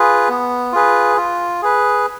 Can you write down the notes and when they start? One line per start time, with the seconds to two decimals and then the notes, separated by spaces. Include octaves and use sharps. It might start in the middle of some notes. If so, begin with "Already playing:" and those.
Already playing: F4 G#4 B4
0.29 B3
0.72 F4 G#4 B4
1.17 F4
1.62 G#4 B4